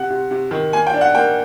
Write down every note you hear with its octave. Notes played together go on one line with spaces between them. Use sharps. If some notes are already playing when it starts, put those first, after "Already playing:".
Already playing: C3 F#5
C3
C3
D#3
A#3 G#5
G5
D4
F#5
A#3 G5